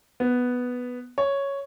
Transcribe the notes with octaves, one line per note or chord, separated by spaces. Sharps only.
B3
C#5